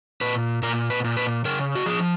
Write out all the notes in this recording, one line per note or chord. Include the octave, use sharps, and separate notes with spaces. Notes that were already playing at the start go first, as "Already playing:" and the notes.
A#2 B4
A#2 A#4
B4
A#2
B4
C#3 A#4
F#4
F3 G#4